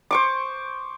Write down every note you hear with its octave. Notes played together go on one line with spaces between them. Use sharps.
C5 C#6 D6